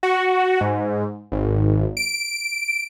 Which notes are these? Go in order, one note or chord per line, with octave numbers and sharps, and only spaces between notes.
F#4
G#2
G#1
D7